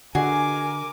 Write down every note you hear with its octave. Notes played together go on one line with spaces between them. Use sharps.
D3 F#4 G#4 A#4 D#5 F#5 G#5 D6